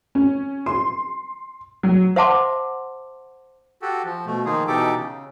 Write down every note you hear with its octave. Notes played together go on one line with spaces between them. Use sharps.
C#4
C6
F#3
C5 E5 F#5 A5 C6 D6
F#4 G4 A4
F3
B2 A3
D#3 F3 A#3 D#4 F4 G#4
B2 E3 D#4 G4 A4 D6
C#3